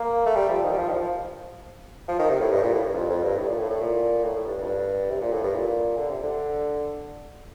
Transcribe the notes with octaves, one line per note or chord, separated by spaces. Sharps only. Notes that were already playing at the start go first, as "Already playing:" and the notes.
Already playing: A#3
A3
G3
F3
D#3
G3
F3
D#3
F3
F3
D#3
C3
A2
G2
A#2
A2
G2
F2
F2
G2
A2
A#2
A2
A2
A#2
A2
A2
G2
F2
G2
C3
A#2
A2
G2
A#2
D3
C3
D3